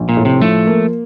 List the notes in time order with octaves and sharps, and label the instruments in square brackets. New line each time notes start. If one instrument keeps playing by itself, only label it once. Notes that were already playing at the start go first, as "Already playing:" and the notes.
Already playing: [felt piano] A#1
[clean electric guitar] A#2
[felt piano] A2
[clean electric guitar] C3
[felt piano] F3 [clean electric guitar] A3
[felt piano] A#3